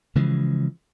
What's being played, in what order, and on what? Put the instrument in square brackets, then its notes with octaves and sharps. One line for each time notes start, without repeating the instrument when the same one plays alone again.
[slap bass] C#3 E3 F3 G#3